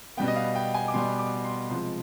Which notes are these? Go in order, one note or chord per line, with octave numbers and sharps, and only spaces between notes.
B2 G3 B3 G5
D#5
F5
G5
G#5
D6
B2 G3 B3 C6
D6
C6
C3 F3 G#3 C6